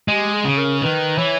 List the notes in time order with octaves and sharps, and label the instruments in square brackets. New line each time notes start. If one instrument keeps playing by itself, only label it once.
[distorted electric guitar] G#3 [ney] G4
[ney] G#4
[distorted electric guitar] C#3
[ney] A#4
[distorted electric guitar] D#3 [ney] B4
[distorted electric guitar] E3 [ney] C#5